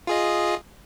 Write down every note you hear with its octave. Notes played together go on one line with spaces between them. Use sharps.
F4 G#4 D#5